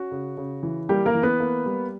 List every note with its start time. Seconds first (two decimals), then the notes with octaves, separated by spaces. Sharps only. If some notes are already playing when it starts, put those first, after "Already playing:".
Already playing: C#4 F#4
0.11 C#3
0.37 C#3
0.63 E3
0.89 G3 A#3 G4
1.06 A#3 A#4
1.15 E3
1.23 B3 B4
1.40 A#3
1.66 G3